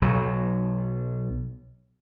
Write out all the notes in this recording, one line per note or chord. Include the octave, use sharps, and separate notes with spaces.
B1 F#3